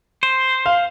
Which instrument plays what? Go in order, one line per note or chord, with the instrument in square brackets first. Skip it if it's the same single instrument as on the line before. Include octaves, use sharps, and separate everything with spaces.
[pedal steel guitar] C5
[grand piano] F5